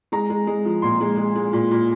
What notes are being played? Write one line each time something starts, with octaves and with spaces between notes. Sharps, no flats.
G#3 A#5
G#3
G#3
F3
A#2 C6
G#3
G#3
G#3
A#2
A#2